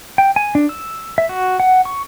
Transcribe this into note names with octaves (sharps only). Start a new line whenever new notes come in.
G5
G#5
D4
E6
E5
F#4
F#5
C#6